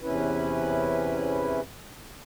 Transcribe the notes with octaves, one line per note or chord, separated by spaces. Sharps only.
E2 C3 C#4 E4 B4